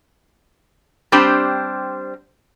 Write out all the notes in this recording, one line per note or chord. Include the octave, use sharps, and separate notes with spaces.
G3 C4 D4 G4 C5